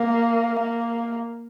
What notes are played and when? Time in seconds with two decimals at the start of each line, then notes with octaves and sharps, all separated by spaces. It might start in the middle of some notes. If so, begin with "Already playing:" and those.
Already playing: A#3
0.59 A#3